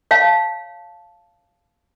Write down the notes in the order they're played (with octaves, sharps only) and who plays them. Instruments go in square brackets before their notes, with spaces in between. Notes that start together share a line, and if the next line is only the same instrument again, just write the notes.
[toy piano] C#5 F5 A5